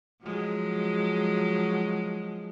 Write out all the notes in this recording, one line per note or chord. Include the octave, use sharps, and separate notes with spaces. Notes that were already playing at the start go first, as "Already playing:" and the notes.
F3 F#3 G#3